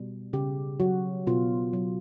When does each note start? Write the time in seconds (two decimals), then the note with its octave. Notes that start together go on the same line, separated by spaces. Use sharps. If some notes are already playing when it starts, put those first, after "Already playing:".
Already playing: B2 G3
0.33 C#3 G4
0.80 F#3 F#4
1.27 B2 F4
1.73 F#3